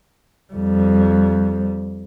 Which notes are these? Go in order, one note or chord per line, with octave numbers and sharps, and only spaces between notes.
F2 G3